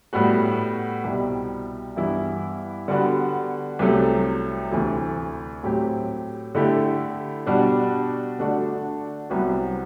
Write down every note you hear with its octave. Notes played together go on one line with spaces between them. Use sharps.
A2 G3 B3 F#4
C2 B2 G3
G2 E3 B3 E4
D3 G3 B3 F#4
C2 C3 F#3 A3
D2 C3 E3 A3
A2 F#3 C4 G4
D3 A3 E4 G4
B2 G3 D4 F#4
D3 A3 D4 F#4
C2 C3 F#3 B3 F#4